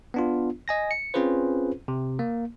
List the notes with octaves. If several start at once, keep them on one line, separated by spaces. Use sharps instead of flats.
B3 D4 F4
D#5 G#5 A#6
C#7
C4 C#4 F4 G#4 B4 C5
C3
A#3